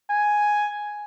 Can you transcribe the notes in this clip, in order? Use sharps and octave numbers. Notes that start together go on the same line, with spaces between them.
G#5